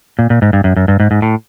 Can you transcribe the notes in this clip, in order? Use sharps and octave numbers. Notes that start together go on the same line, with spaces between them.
A#2
A#2
G#2
G2
F#2
F#2
G2
G#2
G#2
A2